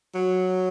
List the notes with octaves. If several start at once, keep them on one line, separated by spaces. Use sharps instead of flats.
F#3